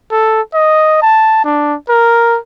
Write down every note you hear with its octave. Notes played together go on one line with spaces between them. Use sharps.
A4
D#5
A5
D4
A#4